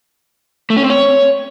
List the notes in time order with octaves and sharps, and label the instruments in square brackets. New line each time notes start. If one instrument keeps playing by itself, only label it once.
[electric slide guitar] A3
C#4
C4
C#5